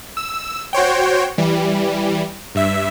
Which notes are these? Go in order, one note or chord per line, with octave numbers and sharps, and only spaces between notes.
E6
F#4 C5 C#5 G5
E3 G3
G2 E5